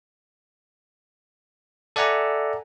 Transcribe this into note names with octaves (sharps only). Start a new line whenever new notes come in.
A4 D5 E5 F#5 G#5 A#5